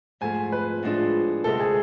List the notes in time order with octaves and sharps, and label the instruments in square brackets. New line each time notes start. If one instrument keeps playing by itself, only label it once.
[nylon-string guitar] G#2 F3 A3 [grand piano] G#5
[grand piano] B4
[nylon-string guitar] A2 F3 G#3 D4 F4
[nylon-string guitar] D2 C3 G#3 C4 [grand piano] A4
[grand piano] G#4